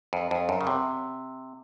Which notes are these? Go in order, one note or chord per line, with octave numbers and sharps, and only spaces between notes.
F2
F2
F#2
C#3
C3